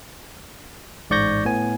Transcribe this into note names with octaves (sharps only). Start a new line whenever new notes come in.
A1 G#2 D5 C#6 G6 A#6
A2 B3 G#5